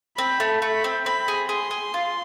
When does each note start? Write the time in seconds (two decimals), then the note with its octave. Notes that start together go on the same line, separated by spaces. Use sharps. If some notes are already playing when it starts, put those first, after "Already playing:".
0.17 C4 B5
0.40 A3
0.62 A3 B5
0.84 C4
1.06 C4 B5
1.28 G#4
1.49 G#4 C6
1.71 G#4
1.94 F4